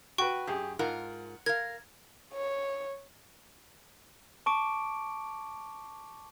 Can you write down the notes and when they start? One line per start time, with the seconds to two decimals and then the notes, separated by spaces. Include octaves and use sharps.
0.18 F#4 B4 G5 C#6
0.47 F#2 G4 G#4
0.79 G#2 F4 A#4 F#5
1.46 A#4 F5 G#6
2.34 C#5
4.46 A5 C#6 D6 D7